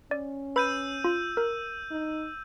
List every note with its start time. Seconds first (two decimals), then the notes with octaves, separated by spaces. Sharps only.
0.11 C#4 D5
0.56 B4 B5 E6 G6 D#7
1.04 F4
1.37 A#4
1.91 D#4